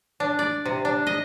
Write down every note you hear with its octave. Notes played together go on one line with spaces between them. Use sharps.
D4
D5
C3
D4
D#5